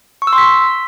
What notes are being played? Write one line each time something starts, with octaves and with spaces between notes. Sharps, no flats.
C#6
E6
C6
B6